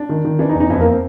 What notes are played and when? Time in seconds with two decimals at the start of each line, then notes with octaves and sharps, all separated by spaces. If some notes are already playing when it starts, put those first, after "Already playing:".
Already playing: D4
0.09 D#3
0.25 D#3
0.39 E3 D4
0.49 D#4
0.55 E2
0.60 D#4
0.70 F2 E3 E4
0.80 A#3 A#4
0.91 C4 C5